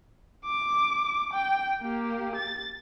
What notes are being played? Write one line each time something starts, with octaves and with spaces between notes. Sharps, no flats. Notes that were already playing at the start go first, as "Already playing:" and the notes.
D6
G5
A#3 G4
A6